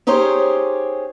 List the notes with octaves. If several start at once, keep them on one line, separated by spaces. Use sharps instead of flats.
C#4 D#4 G4 G#4 C5 C#5